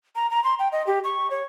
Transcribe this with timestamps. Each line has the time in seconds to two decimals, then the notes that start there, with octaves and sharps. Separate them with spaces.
0.16 A#5
0.31 A#5
0.44 C6
0.59 G5
0.72 D#5
0.87 G4
1.04 C#6
1.30 C#5